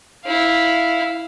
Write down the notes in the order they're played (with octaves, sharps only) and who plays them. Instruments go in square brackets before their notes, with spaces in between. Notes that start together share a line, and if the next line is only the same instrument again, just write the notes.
[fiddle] E4 F5